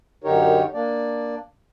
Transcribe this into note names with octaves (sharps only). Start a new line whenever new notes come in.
F#2 D3 D#4 G4 A#4 C#5
A#3 D4 D5